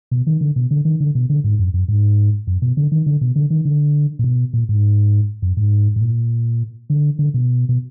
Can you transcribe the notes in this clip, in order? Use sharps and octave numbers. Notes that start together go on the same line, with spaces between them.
B2
D#3
D3
B2
D3
D#3
D3
B2
D3
G#2
F#2
F#2
G#2
F#2
B2
D3
D#3
D3
B2
D3
D#3
D3
A#2
B2
A#2
G#2
F#2
G#2
G#2
A#2
D3
D3
B2
B2